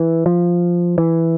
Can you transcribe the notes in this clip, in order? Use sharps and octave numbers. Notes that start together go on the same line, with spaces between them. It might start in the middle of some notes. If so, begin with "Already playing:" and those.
Already playing: E3
F3
E3